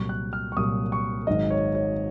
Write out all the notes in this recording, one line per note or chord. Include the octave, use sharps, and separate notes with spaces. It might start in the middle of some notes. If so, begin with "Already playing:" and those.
Already playing: C2 A#2 F#3 C#6
F#6
F6
C#6
C2 A#2 F#3 D#6
C#6
G#1 G#2 F#3 D#5
C#5
C#5